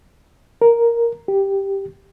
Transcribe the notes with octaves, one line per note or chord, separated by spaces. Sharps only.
A#4
G4